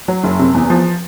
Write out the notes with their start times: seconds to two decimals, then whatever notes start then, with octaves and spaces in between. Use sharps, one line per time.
0.08 F#3
0.24 F#1
0.39 C3
0.54 E2
0.70 F3